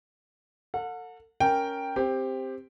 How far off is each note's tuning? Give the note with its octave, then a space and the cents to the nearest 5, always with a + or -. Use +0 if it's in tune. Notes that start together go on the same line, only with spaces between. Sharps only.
A4 +40 F#5 -35
C#4 +10 A#4 +0 G5 +0
C4 +0 G4 +10